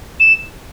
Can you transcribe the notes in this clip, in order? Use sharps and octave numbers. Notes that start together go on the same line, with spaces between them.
E7